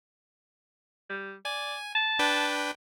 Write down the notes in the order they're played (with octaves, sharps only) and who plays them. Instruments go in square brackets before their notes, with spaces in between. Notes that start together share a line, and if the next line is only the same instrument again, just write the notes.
[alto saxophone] G3
[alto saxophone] D5 [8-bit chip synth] G#5
[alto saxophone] A5
[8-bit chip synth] D4 B4 G5